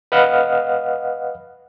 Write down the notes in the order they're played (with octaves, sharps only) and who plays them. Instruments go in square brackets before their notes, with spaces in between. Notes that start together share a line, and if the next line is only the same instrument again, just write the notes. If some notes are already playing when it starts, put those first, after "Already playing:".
[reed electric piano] B4 D#5 F5 F#5 F6